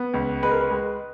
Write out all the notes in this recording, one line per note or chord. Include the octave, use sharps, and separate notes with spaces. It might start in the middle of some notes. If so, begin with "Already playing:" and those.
Already playing: B3
C#2
G#3 B4
A#4
B4
G#3